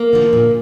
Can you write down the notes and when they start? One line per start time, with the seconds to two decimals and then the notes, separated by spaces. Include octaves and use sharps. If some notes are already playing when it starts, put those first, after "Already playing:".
Already playing: A#3
0.13 D3 F3
0.33 A#2